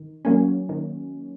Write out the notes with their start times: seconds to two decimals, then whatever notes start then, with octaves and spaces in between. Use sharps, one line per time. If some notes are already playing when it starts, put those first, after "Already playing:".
Already playing: D#3
0.25 F#3 A#3 C#4
0.69 D#3